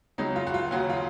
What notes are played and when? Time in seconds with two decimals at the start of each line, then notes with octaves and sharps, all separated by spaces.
0.18 C#2 C#3 F#3 D#4
0.36 F4
0.47 F#4
0.54 F4
0.71 D#2 C#3 F#3 F#4
0.90 F4